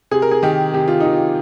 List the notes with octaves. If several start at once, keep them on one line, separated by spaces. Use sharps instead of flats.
C3 G#4
A#4
G#4
D#3 G4
C3 G4
F4
D#3 D#4
F4